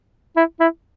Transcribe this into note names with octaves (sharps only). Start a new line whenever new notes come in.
E4
E4